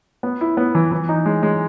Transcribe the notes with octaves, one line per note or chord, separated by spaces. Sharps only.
B3
E4
B3
E3
E3
D#4
G#3
G#3